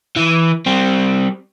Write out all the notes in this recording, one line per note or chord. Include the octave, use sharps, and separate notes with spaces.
E3
G3 C4